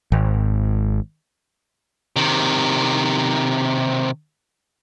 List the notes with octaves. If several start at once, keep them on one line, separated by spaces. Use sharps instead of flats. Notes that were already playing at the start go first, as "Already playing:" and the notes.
G#1
C3 D#3